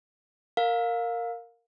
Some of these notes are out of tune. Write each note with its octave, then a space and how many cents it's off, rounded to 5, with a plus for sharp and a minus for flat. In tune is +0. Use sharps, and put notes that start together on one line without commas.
A#4 -10 F5 +20